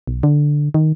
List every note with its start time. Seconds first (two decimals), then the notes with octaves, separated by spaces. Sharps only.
0.07 B1
0.23 D3
0.74 D#3